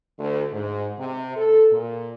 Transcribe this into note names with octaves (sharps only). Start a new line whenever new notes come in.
D2
G#2
C3
A4
A#2